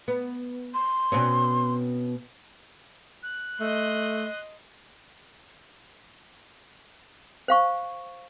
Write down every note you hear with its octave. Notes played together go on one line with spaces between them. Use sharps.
B3
C6
B2 C4 C#4
F#6
A3 D#5 C6
C5 F5 C#6